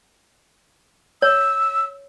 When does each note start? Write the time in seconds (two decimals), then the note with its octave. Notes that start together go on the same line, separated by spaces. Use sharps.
1.22 C#5 E6